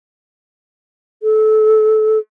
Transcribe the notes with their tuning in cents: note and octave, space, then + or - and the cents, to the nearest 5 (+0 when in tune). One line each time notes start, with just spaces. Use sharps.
A4 -25